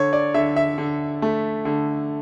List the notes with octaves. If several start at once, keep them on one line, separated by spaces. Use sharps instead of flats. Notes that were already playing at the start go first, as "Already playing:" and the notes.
Already playing: D3 C#5
D5
D3 E5
E5
D3
A3
D3